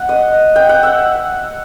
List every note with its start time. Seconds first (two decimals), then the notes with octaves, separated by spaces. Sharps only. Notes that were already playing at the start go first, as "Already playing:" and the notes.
Already playing: F#5
0.09 D#5
0.56 G5
0.69 F#5
0.83 E5